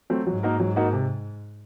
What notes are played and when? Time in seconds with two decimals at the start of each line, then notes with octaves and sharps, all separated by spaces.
0.10 F#3 A3 C4
0.27 G#2 F#3
0.43 A#3 D#4 F#4 A#4
0.60 F#3
0.76 A#3 D#4 F#4 A#4
0.93 C3